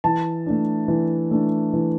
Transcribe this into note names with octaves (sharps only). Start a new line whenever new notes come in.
E3 A5
A3 D4
E3
A3 D4
E3